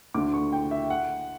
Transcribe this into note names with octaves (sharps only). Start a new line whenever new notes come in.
D2 D3 D6
C#6
G5
E5
F#5